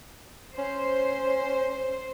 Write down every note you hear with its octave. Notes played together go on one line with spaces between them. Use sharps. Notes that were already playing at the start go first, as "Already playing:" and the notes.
C#4 C5